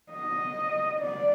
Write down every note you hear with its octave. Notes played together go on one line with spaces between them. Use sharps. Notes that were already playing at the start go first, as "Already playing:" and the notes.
D#5
D5